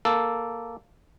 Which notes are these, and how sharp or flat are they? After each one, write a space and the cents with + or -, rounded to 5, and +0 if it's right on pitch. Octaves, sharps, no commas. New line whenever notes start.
A#3 +0 A4 +0